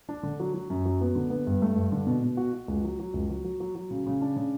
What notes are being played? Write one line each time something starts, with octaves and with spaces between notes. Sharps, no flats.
D4
D3
F#3
F#3
F#2
F#3
B3
D3
B3
G2
A3
G2
D3
B2
B2
F#4
F#4
C#2
F#3
F#3
C#2
F#3
F#3
F#3
F#3
C#3
C#3
D4
C#3